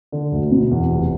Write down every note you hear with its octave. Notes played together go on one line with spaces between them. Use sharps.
D3
D2
B2
E2
F1